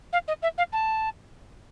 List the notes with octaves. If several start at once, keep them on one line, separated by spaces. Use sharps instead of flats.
F5
D#5
E5
F5
A5